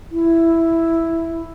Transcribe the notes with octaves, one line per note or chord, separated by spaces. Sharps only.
E4